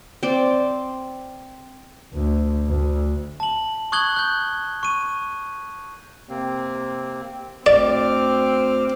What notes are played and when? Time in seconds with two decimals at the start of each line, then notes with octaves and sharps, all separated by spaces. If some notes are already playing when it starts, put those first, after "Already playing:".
0.23 C4 D5
2.14 D2
2.67 D2
3.40 A5 F#7
3.92 C#6 D#6 F#6 G#6 F#7 G7
4.16 F#6 G6
4.83 C#6 D#7
6.29 C3 A#3 C4
7.66 D2 C4 D5 D6 F6